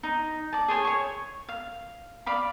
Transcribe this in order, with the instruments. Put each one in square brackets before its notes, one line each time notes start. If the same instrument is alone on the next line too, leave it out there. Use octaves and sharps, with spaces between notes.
[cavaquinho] D#4
D5 A5
G#4 C5 C#5 G#5
C#5 C#6
F5
D5 F5 B5